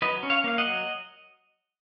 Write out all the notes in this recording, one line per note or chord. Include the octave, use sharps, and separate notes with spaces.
F#3 B4 D#5
C#4
C#5 F5
A#3 F5
D#5 F#5
F#3